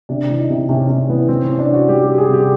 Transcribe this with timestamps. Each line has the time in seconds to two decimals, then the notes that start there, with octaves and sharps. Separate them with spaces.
0.09 C3 D4
0.30 E3
0.39 D#4
0.50 C3
0.69 C3 C#4
0.89 C3 C#4
1.09 E3 B3
1.28 E3 C4
1.44 C#4
1.49 C3
1.59 D4
1.68 E3
1.74 F#4
1.88 G3 G4
2.03 G4
2.08 G3
2.14 G4
2.18 G#4
2.29 C3 G4